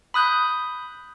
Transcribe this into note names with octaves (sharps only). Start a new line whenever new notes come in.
B5 D#6 F#6 G6